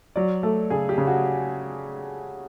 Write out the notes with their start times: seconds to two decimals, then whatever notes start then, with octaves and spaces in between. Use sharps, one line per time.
0.16 F#3 D5
0.43 A3 A4
0.70 C#3 G#4
0.89 G4
0.98 C#3
1.07 F#4